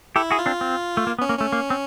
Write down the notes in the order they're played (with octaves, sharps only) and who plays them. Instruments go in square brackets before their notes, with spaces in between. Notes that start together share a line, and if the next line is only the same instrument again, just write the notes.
[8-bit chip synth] E4 [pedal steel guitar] G4 A4
[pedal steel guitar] F#4 G#4
[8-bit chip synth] F4
[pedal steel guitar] C4 D4
C4
A3
A#3
B3
[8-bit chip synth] C#4
[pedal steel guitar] A#3
[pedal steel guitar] A3 [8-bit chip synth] C#4
[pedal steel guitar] A#3
C4